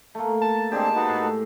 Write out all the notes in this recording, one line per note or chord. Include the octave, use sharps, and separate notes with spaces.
A3 A#3
A5
G#3 C4 D4 G4 G#4
D#4 F#4 B4
A2